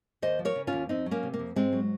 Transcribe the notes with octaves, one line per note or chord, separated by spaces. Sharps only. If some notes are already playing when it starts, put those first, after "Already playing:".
D#2 C5 D#5
F3
A#4 C#5
C#3
C#4 F4
D#2
F2 C4 D#4
F#3
A#3 C#4
C3
A#3
F2
G#2 G#3 C4
F#3